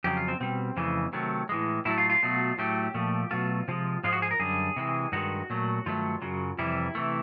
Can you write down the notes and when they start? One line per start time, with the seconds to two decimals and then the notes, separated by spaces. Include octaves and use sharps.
0.04 F2 C#3 F#3 G4
0.17 F4
0.28 C4
0.40 B2 G3 C4
0.77 F2 C#3 E3 A3
1.13 C3 D#3 F#3 A3
1.49 A2 E3 G#3
1.85 A2 F#3 A3 E4
1.98 F4
2.10 F4
2.23 B2 F#3 A3
2.58 A2 F#3 A3 G4
2.94 A#2 F3 A3
3.31 B2 F#3 A3 F4
3.68 C3 F3 G#3
4.03 G#2 F3 G#3 F4
4.12 F#4
4.22 G#4
4.31 A#4
4.40 F#2 D3 G3 G#4
4.76 C3 E3 G#3
5.12 G2 D#3 G#3 F#4
5.50 A#2 F#3 A3
5.86 G2 D#3 F#3 A3 F4
6.22 F#2 C#3 F#3
6.58 F2 C3 E3 G3 E4
6.95 C3 E3 A3